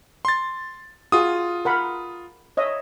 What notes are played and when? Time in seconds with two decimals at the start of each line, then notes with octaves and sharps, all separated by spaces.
0.25 C6 A6
1.12 F4 F#4 G#4 D#6
1.65 A#4 F#5 B5
2.57 C#5 D#5 E5